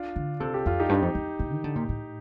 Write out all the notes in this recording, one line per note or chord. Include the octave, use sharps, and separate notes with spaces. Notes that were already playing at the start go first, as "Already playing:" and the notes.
Already playing: D4 F4
D3
C3 A4
G4
F2 F4
D#4 G4
G2
F2
F2
A2
D#3
D3
A#2
A2